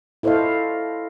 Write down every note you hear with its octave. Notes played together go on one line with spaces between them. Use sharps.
E4 A4 C5 C#5 D#5 F5